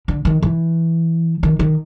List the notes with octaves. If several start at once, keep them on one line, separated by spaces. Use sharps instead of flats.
D3
D#3
E3
D#3
D#3